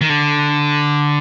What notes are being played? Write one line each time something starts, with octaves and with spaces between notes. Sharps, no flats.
D#3
D3